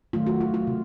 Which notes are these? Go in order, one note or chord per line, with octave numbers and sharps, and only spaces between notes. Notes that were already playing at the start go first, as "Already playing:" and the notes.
D#3 F#3 A3 F4
F#4
F4
F4
C3